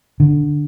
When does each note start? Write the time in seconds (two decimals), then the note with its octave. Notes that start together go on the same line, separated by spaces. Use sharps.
0.20 D3